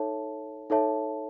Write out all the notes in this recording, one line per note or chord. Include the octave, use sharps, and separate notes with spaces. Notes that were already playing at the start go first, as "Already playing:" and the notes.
Already playing: D#4 A4 C#5 E5 A5
D#4 A4 C#5 E5 A5